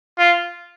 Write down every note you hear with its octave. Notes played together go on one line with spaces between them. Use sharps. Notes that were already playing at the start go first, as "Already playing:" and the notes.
F4